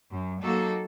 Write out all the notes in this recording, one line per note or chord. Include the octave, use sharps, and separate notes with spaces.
F#2
F#3 A#3 D#4 F#4 A4